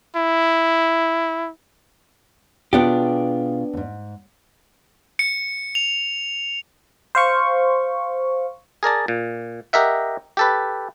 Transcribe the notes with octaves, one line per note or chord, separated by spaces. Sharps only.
E4
B2 B3 D4 F4 G4 G#4
D#2 G#2
C#7
F7
C5 F5 C#6
G#4 A#4 D5 A5
A#2
G4 A#4 D#5 E5 F#5
G4 A4 B4